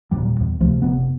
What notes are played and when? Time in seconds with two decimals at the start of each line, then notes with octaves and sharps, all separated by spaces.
0.11 D#1 B1 A#2 G3
0.40 E2
0.61 D2 C3 F3 A3
0.82 F1 C3 B3